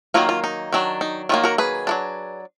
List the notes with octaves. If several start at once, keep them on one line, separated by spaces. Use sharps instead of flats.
D#3 F#3 A#3 F4
F4
D#4
D#3 F#3 D4
D#4
D#3 F#3 A#3 F4
F#4 A#4
G#4 B4
F#3 A#3 D4